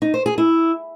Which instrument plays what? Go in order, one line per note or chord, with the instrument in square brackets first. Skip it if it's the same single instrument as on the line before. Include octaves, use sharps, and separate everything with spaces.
[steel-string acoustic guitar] D#4
C5
G#4
E4